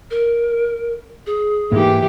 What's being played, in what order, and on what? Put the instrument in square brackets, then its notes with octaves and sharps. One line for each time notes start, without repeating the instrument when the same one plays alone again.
[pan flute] A#4
G#4
[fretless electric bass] G#2 A#3 [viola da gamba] E3 G4